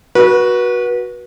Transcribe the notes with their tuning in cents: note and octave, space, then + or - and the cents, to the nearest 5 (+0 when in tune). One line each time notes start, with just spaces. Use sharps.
F#4 +0 B4 -30